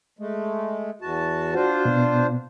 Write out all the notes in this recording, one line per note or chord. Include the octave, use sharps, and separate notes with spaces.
G#3 A3
E2 F#4 A5
D4 F4 F#4 C5
B2 B3